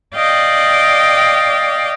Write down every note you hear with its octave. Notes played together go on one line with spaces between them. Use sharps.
D5 D#5 F5 G5